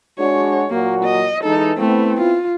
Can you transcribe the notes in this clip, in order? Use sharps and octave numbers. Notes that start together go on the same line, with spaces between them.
G#3 D4 F#4 C#5
A#2 F#3 A#3 F#4
D#5
E3 G#3 D#4 A4
A3 B3 C4 E4
F4